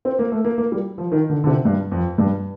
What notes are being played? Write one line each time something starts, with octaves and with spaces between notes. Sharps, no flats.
C4
A#3
A3
A#3
A#3
G3
F3
D#3
D3
D3
C3
G2
F2
G2